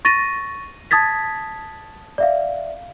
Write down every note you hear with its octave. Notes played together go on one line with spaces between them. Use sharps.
C#6 A6 A#6 D#7
A5 D#6 G#6 A6 B6
D5 E5 F5